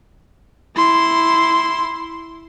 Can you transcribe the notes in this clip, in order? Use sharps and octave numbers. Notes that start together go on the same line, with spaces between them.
E4 C6